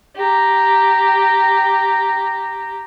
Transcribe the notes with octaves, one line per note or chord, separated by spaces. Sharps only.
G4 A#5